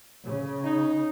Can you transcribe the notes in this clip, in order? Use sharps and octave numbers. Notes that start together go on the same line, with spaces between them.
C#3
D#4